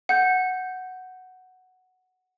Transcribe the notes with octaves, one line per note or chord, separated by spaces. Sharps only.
F#5 G6